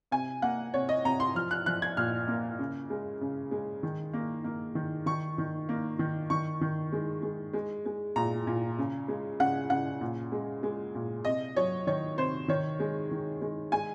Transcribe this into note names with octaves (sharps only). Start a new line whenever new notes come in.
C3 G#5
A#3 F#5
C3 C#5
D#5
C3 A#5
C6
F3 F6
F#6
F3 F#6
G#6
A#2 F6
A#3
C#3
G#3
C#3
G#3
D#3
A#3
A#3
D#3
D#3 C#6
D#3
A#3
D#3
D#3 C#6
D#3
G#3
G#3
G#3
G#3
A#2 A#5
A#2
C#3
G#3
C#3 F#5
C#3 F#5
A#2
G#3
G#3
A#2
C3 D#5
F#3 C#5
D#3 C#5
C3 C5
D#3 C#5
G#3
D#3
G#3
G#3 G#5